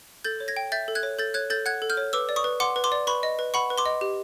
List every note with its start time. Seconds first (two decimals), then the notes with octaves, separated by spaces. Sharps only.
0.24 A4 G6 A6
0.40 C#5
0.48 G#6 A#6
0.57 G5
0.72 E5 G6 A6
0.88 A4
0.95 F#6 G#6
1.03 C#5
1.19 A4 G6 A6
1.34 C#5 F#6 G#6
1.50 A4 G6 A6
1.66 F#5 F#6 G#6
1.82 A4
1.90 F6 G6
1.97 C#5
2.13 B4 D6 E6
2.29 D5
2.36 C#6 D#6
2.44 B4
2.60 F#5 C6 D6
2.76 B4
2.84 C6 D6
2.92 D5
3.07 B4 B5 C#6
3.23 D#5
3.39 B4
3.54 F#5 B5 C#6
3.70 B4
3.78 C6 D6
3.86 D#5
4.01 G4